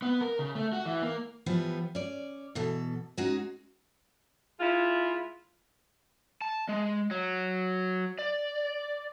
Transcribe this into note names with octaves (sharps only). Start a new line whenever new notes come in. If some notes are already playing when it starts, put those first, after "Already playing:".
B3
A#4
C#3
A3
F#4
E3
A#3
E3 F3 G3 B3
C#4 D5
B2 E3 A4
G#3 C#4 D#4 F#4 G#4
G#3 E4 F4
A5
G#3
F#3
D5